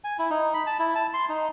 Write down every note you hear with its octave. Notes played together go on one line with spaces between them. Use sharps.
G#5
E4
D#4
B5
A5
E4
A5
C6
D#4